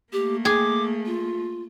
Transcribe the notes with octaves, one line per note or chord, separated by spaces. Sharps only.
A3 A#3 G4
G#4 D6
F4